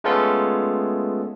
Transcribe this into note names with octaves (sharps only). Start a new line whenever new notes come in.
G#3 A3 B3 C#4 F4 A4